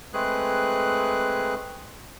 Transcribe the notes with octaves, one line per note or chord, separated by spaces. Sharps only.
G#3 A3 C4 G#4 B4 F#6